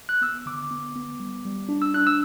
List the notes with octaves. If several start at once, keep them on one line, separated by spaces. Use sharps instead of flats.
F#6
B3 E6
D3 D6
B3
B3
G3
G3
D4
E6
D4 F#6
E6